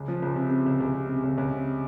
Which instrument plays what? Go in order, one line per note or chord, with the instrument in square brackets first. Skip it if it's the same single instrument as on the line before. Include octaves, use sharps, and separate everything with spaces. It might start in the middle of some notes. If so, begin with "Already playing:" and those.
Already playing: [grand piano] C#2
F3
C#2
C3
C3
C#2
C#2
C3
C3
C#2
C#2
C3